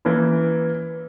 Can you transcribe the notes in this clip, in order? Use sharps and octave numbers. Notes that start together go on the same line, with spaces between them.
E3 A#3 C#4 E4